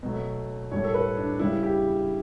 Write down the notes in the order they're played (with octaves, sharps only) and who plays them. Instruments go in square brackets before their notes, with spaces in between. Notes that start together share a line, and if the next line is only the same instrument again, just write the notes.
[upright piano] B2 F#3 A3
A2 G3 C#5
A4
B4
D4
C#3 G3 E4
G4